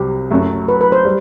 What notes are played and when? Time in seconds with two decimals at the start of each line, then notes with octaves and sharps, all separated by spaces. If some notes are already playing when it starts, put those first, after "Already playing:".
Already playing: C2 C3 F#3 G4
0.30 F#1 F#2 F#3 A3
0.68 B4
0.81 B4
0.92 C5
1.05 G3